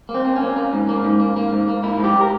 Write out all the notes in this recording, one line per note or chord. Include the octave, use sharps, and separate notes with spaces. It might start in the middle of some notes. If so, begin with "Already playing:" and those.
A#3
C4
A#3
C#4
A#3
A#3
G#2
A#3
G#2
A#3
A#3
G#2
A#3
A#3 E4
G#2
G4
A#4